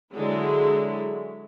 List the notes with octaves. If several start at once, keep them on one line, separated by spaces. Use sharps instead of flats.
D3 F#3 G#3 E4